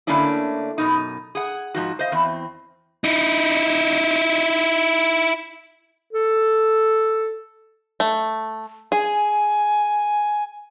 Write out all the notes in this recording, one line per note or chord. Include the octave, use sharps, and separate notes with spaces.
D3 A3 A#3 C#4 D4 E4
F#2 B2 D#4
G#4 F#5
G#2 F3 F#4
C5 D#5 F5
E2 C4
D#4 E4
A4
A3
G#4 G#5